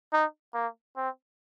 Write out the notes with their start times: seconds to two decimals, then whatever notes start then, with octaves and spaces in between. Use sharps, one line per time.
0.12 D#4
0.54 A#3
0.96 C4